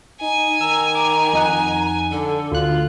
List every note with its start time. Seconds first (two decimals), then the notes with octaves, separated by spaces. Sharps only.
0.21 D#4 G#5
0.61 D#3 A#5 E6
0.95 D6
1.33 F2 D#4 F#5
2.11 D3 A4
2.52 D2 D3 F4 F#6